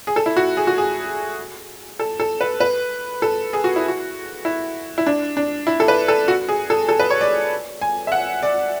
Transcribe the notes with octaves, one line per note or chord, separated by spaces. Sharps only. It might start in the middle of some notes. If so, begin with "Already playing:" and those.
G#4
A4
E4
F#4
G#4
F#4
G#4
A4
A4
B4
B4
A4
G#4
F#4
E4
F#4
E4
E4
D4
D4
E4
A4
B4
A4
F#4
G#4
A4
A4
B4
C#5
D5
G#5
E5
F#5
D5